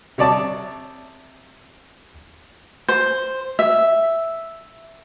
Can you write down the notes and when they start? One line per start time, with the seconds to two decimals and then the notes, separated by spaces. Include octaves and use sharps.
0.18 C3 C#5 D5 A5 D#6
2.89 C5
3.59 E5